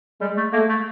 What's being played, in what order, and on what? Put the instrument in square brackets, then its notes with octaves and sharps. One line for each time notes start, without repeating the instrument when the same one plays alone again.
[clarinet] G3 [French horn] G#3
[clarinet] A3
[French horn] A3 [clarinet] A#3
[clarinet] A3